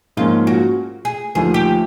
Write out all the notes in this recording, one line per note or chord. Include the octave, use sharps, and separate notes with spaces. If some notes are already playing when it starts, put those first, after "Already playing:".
G#2 F3 A#3 C#4 F4
F#4
G#4
D#2 D3 F3 A3 G#4
G4